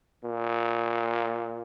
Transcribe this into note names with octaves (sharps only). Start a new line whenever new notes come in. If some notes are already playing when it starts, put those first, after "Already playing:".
A#2